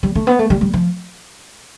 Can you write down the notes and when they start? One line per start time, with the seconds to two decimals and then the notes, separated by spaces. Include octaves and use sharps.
0.03 G3
0.15 A3
0.27 B3
0.39 A3
0.50 G3
0.61 G3
0.74 F3